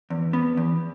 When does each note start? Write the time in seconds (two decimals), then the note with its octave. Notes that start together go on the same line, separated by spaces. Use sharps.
0.10 E2
0.33 B3
0.57 E2